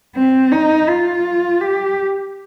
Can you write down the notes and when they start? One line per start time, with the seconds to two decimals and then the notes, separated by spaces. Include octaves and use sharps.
0.16 C4
0.52 D#4
0.89 F4
1.61 G4